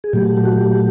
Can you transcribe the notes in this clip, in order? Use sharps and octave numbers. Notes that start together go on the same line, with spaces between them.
G#4
A#2 F#3 A3 G4
G4
F#4
G4